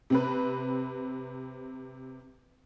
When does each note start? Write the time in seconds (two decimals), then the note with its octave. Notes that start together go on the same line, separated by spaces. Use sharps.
0.10 C3 C4 B4